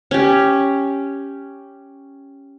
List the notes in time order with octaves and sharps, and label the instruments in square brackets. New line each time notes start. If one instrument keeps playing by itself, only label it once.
[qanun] C#4 G4